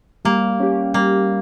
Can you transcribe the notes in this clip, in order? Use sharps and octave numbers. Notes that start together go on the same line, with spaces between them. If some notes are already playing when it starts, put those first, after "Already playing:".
G3 A#3
C#4 G4
G3 A#3